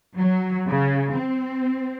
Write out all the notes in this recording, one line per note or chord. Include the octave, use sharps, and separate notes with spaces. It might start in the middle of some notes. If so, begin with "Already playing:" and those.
F#3
C#3
C4